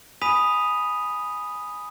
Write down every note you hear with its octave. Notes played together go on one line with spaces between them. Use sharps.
G#5 B5 D#6 B6 D#7 F7